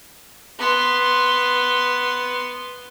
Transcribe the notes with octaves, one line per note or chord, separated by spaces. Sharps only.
B3 C6